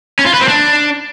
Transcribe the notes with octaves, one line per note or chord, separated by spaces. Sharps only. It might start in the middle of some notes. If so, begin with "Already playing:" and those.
C#4
F4
B4
C4
D4